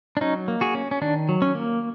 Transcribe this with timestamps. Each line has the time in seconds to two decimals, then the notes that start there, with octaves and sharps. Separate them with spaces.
0.17 D4
0.21 F#3 C#4 D#4
0.48 A#3
0.61 F#4 G#4
0.75 C#4
0.91 C#4
1.02 D#3 D4
1.29 F#3
1.42 C#4
1.55 A#3